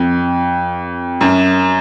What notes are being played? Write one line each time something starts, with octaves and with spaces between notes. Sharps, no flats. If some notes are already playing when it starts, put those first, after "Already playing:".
Already playing: F2
F#2